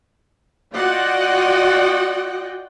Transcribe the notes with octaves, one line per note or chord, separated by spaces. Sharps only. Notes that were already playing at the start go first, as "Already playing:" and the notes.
F4 F#4 D5 D#5 F#5 G5